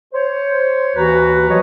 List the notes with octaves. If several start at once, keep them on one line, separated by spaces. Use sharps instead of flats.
C5 C#5
D#2 E3 F#4 B4 A#5
F3 F#3 F#4 C#5 D#5